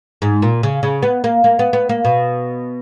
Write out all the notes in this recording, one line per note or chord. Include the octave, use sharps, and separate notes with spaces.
G#2
A#2
C#3
C#3
B3
A#3
A#3
B3
B3
A#3
B2